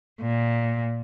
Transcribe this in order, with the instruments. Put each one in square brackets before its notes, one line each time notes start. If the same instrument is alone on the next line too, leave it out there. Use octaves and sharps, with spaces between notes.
[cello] A#2